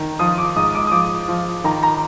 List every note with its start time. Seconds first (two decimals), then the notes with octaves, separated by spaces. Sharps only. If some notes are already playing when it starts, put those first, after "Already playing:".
Already playing: D#3
0.19 F3 D#6
0.38 D6
0.56 G#2 D#6
0.75 D6
0.87 D#6
0.91 F3 D6
1.28 F3
1.64 D#3 A#5
1.83 A#5